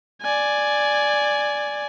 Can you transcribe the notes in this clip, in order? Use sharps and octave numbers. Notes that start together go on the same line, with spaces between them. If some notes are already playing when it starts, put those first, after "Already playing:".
D5 G#5